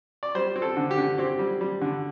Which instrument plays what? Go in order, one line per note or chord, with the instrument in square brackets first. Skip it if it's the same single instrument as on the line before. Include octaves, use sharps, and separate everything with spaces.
[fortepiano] D5
G3 C5
C4
A4
D3
G4
D3
C4 G4
G3
G3
D3